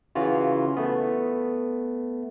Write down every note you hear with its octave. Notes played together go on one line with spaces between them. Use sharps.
C#3 E3 F4 F#4
A3 B3